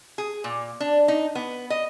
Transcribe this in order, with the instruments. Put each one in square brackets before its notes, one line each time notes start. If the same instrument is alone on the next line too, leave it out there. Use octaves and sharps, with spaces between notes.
[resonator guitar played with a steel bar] G#4
A#2
D4
D#4
B3
D#5